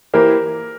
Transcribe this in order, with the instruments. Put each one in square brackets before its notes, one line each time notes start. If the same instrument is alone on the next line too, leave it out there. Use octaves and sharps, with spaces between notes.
[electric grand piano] E3 A#3 E4 G4 C5 [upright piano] A#4